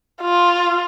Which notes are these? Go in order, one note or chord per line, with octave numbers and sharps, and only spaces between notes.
F4